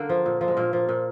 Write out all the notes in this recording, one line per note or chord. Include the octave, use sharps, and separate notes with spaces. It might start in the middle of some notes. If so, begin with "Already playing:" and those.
Already playing: D3 A#3
F3
A#2
F3
G#3
A#2 A#3
F3
A#2